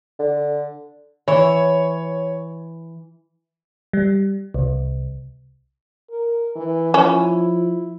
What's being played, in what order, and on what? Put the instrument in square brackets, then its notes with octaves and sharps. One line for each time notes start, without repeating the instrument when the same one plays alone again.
[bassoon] D3
[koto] E3 [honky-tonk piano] C#5
[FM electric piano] G3
C2
[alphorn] A#4
E3
[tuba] F3 [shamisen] C#4 [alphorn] E4